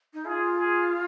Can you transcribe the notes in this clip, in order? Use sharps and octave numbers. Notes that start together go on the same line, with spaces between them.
D#4
F4 G#4
G#4